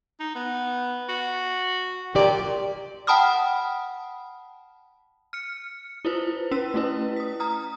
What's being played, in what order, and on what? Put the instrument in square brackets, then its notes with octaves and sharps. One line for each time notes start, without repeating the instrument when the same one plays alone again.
[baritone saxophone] D#4
B3
F#4
[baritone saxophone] A#2 [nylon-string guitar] G4 D5
[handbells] F#5 G5 A5 B5 D#6 F6
[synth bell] F6 C#7
E4 F4 B4 C5
C#4 E6 B6
A3 C#4 E4 B4
D#6 B6
A#5 D#6 F6